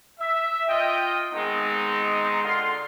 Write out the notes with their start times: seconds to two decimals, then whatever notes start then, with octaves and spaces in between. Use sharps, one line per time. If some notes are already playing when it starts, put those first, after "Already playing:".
0.20 E5
0.68 F4 D#5 G5
1.33 D#3 G#3 B3 C4 D#4
2.44 D3 F4 C6